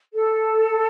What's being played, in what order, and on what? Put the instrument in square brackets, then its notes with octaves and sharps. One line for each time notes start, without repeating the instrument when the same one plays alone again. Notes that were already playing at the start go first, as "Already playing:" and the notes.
[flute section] A4